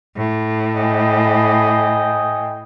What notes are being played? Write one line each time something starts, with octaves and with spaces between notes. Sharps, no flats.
A2
D#5 G5 G#5